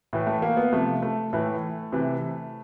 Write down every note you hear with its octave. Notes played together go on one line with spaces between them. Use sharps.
A2 E3
A3
A#3
B3
C3 F3 A3
A3
A2 E3 A3
C3 E3